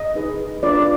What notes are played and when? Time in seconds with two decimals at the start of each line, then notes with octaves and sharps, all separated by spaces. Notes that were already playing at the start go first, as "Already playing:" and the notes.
Already playing: D#5
0.15 D#4 G#4 B4
0.63 D4 F4 B4 D5